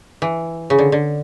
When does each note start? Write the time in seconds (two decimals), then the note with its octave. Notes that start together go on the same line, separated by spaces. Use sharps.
0.22 E3
0.70 C#3
0.78 D3
0.92 D3